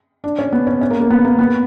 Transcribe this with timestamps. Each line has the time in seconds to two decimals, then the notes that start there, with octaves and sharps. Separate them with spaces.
0.24 D4
0.39 C#4
0.53 B3
0.67 C#4
0.81 C#4
0.91 A#3
1.01 A#3
1.10 B3
1.25 A#3
1.39 B3